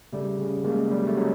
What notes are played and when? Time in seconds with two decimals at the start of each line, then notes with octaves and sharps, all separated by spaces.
0.13 C#3 G3 A3
0.39 C#3
0.64 C#3 G#3 A#3
0.91 F#3 G3
1.07 A3
1.17 C#3 F#3 G#3